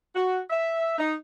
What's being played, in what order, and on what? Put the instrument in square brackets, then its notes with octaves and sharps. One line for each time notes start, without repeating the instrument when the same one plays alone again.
[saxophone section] F#4
E5
D#4